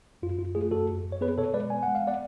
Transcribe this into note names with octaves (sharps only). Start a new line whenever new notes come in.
F#2 F4
F#2 F4
A3 F4 G#4
F#2 F#4 A4
F#2
F#2
C#5
B3 G#4 B4
B2 A4 C#5
G#3 B4 D5
B3 G#5
F#5
G#3
F5
B3 D5 F#5